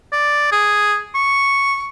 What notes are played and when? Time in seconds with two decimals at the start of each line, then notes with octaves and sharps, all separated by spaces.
0.12 D5
0.52 G#4
1.15 C#6